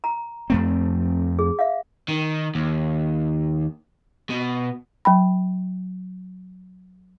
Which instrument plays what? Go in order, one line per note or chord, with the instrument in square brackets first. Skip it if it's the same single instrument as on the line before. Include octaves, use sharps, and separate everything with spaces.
[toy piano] A#5
[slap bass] F2 A3 C4
[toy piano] G#4
E5 F5
[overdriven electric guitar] D#3
D#2
B2
[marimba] F#3 G5 B5